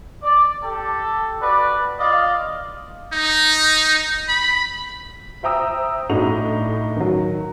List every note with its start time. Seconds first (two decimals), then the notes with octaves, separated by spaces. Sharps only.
0.23 D5
0.63 G4 A4
1.41 F#4 B4 D5
2.00 F4 D5 D#5 F5
3.13 D#4
4.29 B5
5.43 C5 E5 G5 A#5 D#6 E6
6.09 A2 D4 D#4 F#4 F7
6.96 D#3 F#3